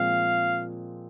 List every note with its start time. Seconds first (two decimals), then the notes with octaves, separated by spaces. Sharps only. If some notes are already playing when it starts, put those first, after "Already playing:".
Already playing: A#2 F3 G#3 C4 F5